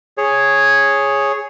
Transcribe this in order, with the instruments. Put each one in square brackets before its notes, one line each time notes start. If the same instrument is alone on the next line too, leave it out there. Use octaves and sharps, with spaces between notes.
[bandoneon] G#4 C#5